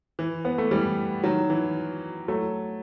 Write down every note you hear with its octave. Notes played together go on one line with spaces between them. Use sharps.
E3
B3
A3
E3 G3
D#3 F#3
E3
F#3 A3